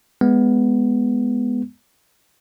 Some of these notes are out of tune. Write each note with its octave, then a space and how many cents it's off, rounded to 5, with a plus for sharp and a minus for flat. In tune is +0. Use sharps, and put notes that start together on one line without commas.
G#3 +0 B3 +0